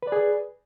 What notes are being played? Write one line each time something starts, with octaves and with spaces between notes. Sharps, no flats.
G#4 B4 D5